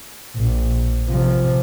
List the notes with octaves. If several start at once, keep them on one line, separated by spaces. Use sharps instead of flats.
A#1
C3 F3